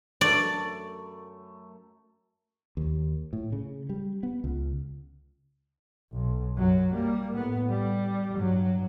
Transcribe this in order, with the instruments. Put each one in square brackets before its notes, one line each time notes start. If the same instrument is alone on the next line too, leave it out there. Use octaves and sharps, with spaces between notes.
[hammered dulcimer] F#2 A3 C#6 [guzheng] D5
[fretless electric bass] D#2
A2
C#3
G3
B3
C#2
[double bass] B1
F#2 F#3
G3 A#3
A2 B3
G3
G2 F#3